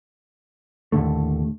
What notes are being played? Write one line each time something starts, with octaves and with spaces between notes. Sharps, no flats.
D#2 A2 D3 A3